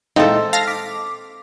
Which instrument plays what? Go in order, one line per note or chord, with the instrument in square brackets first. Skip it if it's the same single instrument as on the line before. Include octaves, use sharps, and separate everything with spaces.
[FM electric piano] A#2 G#3 E4 [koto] C4 A4 [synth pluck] D#4 [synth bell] D#5 F5
[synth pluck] F5 A#6 [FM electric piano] A5
[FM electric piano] D6 [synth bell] B6